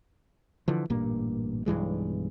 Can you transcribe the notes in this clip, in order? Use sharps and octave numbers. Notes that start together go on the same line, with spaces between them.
D3 E3 F3
A1 G2 A#2 A#3
B1 G2 E3 G#3